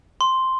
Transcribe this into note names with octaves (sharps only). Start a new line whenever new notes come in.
C6